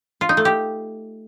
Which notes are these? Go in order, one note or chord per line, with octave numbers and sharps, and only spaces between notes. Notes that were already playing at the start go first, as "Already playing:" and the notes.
F4
D#4
A3
G4